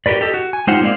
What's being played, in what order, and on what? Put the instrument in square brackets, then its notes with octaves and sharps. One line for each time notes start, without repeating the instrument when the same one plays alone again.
[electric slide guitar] F#4 G4 A#4 B4 D5
G4 A4 D#5
F#4
G#5
G#3 D#4 F4 G4 C5 F#5
G#3 A#3 C4 C5 D5 F5